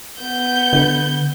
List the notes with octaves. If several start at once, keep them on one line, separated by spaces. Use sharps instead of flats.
B3 G6
D3